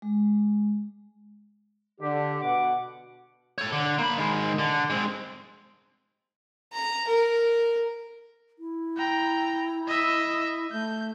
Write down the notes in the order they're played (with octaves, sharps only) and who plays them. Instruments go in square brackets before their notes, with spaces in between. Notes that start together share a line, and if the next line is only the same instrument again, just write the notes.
[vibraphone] G#3
[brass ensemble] D3 [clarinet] G4
[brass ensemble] B2 F#5 [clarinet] D6
[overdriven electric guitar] A4 C#5
D3
A#3 B5
D#3 G#3
D3
G#3 C4
[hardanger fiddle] A#5
A#4
[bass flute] E4
[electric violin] G5 A#5
D#5 E5
[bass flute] A3 [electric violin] G6